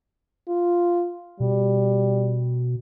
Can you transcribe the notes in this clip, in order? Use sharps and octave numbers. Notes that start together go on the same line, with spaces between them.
F4
B2 G3